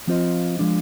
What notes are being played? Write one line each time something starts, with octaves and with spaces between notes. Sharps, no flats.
F3 C4 F4 C5 D#5
F3 G#3 D4